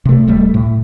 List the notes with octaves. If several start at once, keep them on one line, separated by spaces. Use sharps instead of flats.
C3 A3
D1 G3 A3
A2